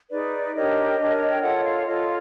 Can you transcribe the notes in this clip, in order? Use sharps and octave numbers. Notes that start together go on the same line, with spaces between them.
D#4 G#4 B4 D5
D4 G4 A#4 C#5 D#5
D4 G4 A#4 C#5
G5
F4 A4 C#5 F#5
F5
F4 A4 C#5 D#5